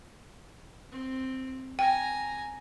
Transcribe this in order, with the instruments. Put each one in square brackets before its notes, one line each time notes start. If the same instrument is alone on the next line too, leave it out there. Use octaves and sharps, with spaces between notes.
[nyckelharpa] C4
[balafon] G5 [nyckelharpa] G#5 A#5